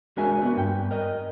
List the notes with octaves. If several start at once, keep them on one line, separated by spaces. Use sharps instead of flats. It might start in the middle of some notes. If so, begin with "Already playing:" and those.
G#3 D4 F#4 A#4 E5 G#5
A3 B3 F#4
G2 G5
A#4 D#5